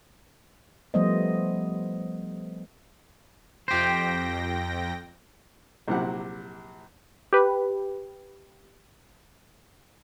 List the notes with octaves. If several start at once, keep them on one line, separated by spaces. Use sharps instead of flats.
F3 G3 A3 B3 C5 D#5
F2 G4 C5 G5 A#6
A#1 C3 F#3 E4 G4 F#5
G4 B4